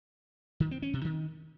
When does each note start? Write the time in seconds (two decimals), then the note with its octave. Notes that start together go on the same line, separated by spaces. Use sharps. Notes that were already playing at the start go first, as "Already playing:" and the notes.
0.60 D#3
0.71 C4
0.82 C#4
0.94 C3
1.05 D#3